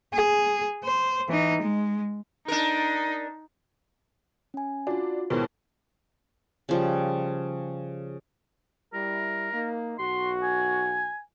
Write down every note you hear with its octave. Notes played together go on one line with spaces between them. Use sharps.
G#4
C5
E3 D#4
G#3
D4 D#4 A#4
C#4 G#5
D4 F4 F#4
D#2 G#2 B2 E4 A#4 C5
C#3 F3 G3
G3 E4 A#4
A#3 D#4
B1 F#4 C6
G#5